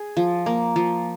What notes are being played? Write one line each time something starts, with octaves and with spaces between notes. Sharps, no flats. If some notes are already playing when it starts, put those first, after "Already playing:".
Already playing: G#4
F3
A#3
F3